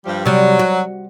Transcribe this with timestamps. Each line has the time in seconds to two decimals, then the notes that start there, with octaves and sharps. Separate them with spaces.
0.05 G2 F3 G3
0.25 C3 F#3 G3
0.59 F#4